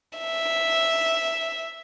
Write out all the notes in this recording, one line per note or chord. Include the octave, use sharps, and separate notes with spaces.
E5